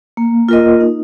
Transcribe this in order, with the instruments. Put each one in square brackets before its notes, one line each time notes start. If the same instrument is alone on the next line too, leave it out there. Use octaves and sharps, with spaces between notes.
[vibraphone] A#3
F4 A#4 D#5
D#4